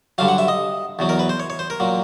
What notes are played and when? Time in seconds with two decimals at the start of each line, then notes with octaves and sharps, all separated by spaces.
0.18 G2 D3 F#3 F5
0.28 F#5
0.38 E5
0.48 D#5
0.99 E2 B2 F#3
1.09 A#4
1.19 B4
1.29 C5
1.40 C#5
1.50 C#5
1.59 C5
1.70 A#4
1.80 A#2 F#3